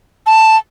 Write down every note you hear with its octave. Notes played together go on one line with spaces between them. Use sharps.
A5